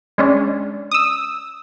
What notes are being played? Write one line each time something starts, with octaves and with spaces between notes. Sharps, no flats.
G#3 C#4 D4
D#6 E6